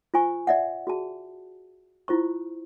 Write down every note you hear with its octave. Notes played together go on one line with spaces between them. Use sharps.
F4 C5 G#5 C#6
D5 E5 F#5
F#4 G#4 A5
E4 F4 C5 C#6